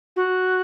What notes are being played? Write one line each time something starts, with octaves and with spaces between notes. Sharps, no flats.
F#4